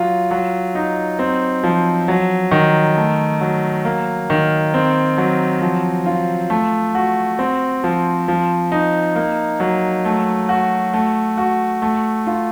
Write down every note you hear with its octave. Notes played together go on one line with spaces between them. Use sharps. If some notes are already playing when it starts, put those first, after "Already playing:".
Already playing: F#3 F4
F#3
D#4
C4
F3
F#3
D#3
A3
F#3
A#3
D#3
C4
F#3
F3
F4
A3
F#4
C4
F3
F3
D#4
A#3
F#3
A3
F#4
A3
F#4
A3
F4